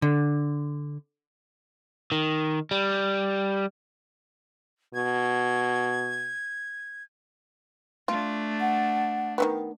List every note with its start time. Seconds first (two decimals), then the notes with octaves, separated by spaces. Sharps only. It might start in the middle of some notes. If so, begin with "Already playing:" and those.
0.02 D3
2.12 D#3
2.71 G3
4.94 B2 G#6
8.08 A3 D4 F4
8.61 F#5
9.38 D#3 E3 B3